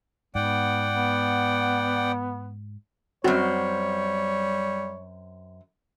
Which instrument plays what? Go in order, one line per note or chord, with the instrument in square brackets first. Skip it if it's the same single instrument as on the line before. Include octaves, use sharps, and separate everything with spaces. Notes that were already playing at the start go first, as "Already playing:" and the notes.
[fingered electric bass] G#2 [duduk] B3 [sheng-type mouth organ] D5 F#5 G5
[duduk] B3
[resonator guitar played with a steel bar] F#2 C4 [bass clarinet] G3 [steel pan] F#4 [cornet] C#5